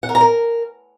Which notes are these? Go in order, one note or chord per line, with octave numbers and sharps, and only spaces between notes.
F#5
A#4
A#5
A#4